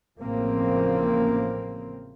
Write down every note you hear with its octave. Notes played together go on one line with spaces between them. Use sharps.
A1 A2 C#3 F3 A#3 C4